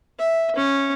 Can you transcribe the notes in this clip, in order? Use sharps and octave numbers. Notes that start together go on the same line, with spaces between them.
E5
C#4